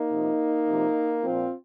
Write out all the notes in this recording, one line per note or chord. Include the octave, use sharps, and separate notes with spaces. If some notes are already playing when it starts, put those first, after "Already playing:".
Already playing: A#3 D#4
C3 F3
C3 F3
A#2 F3 C4 F4